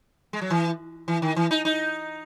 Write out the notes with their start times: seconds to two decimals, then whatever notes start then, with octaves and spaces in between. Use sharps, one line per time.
0.33 G#3
0.41 F#3
0.50 E3
1.08 E3
1.22 D#3
1.36 E3
1.51 D#4
1.65 D#4